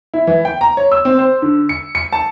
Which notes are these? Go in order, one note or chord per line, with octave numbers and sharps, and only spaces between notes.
E4
E3
G5
A#5
C#5
E6
C4
C5
D3
C#7
C#7
A5